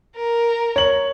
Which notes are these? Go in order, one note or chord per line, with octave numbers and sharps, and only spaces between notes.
A#4
C#5 F#7